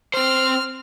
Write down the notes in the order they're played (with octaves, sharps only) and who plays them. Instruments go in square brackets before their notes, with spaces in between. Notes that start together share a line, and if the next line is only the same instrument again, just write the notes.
[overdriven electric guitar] C4 C5 [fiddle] F6